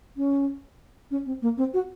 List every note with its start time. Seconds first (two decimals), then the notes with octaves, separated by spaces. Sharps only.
0.17 C#4
1.11 C#4
1.26 C4
1.42 A#3
1.58 C4
1.74 F#4